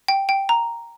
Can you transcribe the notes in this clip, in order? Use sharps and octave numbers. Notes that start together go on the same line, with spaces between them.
G5
G5
A#5